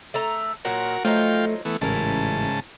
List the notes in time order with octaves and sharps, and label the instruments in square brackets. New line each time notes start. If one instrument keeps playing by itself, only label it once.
[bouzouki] A3 A4 A#5
[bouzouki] A#2 F#3 [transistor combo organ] F#4 A#4
[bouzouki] F3 F#3 D#4 [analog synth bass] A3 [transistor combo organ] F4 F5 G5
[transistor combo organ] E3 A3 B3
[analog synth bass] A1 [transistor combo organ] G#2 C#3 A5 [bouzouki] E4 A#4